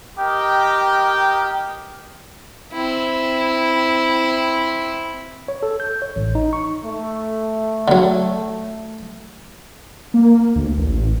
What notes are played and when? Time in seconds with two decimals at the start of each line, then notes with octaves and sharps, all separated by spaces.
0.17 G4 A#4 D#5 G5
2.73 C4 E4
5.48 C#5
5.63 A4
5.80 G6
6.02 C#5
6.16 A1
6.35 D#4
6.53 C#6
6.84 A3
7.88 D3 F#3
10.14 A#3
10.56 D2
10.78 A1